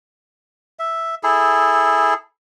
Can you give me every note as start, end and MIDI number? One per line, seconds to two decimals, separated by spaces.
0.79 1.15 76
1.23 2.14 64
1.23 2.14 68
1.23 2.14 69